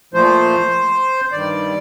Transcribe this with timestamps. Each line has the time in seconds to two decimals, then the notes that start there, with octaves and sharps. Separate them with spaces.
0.14 A#2 F3 A3 C5
1.32 G2 D#3 G3 D5